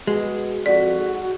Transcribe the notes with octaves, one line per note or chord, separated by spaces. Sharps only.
B2 G#3 G#4
F2 F#4 D5
G#2